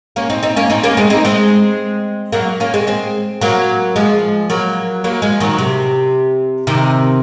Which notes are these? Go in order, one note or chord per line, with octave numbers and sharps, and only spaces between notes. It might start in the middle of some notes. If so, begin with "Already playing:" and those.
A#3 C#4
C4 D#4
C4 D#4
A#3 C#4
C4 D#4
A#3 C#4
G#3 C4
C4 D#4
G#3 C4
F#3 A#3
A#3 C#4
G#3 C4
G#3 C4
F#3 A#3
F3 G#3
F#3 A#3
F#3 A#3
F3 G#3
D#3 F#3
C3
C3 D#3